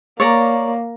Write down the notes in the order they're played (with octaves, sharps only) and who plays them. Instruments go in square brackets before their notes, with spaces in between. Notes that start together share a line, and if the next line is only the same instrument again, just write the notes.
[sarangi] A#3 [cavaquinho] C#5 D5 A#5